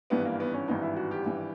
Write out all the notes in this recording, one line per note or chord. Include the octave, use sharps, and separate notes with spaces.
G#1 G2 E3 B3
A#3
B3
C#4
G#1 G2 E3 D#4
E4
F#4
G4
G#1 G2 E3